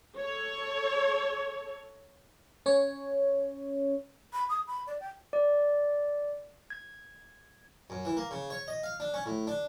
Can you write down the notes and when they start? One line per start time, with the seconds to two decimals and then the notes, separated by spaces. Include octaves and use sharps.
0.18 A4 C#5
2.66 C#4 C#5
4.32 B5
4.49 D#6
4.67 B5
4.87 D5
5.00 G5
5.33 D5
6.70 G#6
7.90 F#2
8.05 E3
8.17 A#3
8.31 C#3
8.50 C#5
8.68 D#5
8.83 F5
9.00 D4
9.14 C#4
9.26 A2
9.47 D4